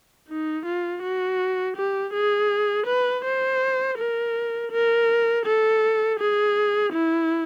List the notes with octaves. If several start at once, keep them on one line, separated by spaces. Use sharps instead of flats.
D#4
F4
F#4
G4
G#4
B4
C5
A#4
A#4
A4
G#4
E4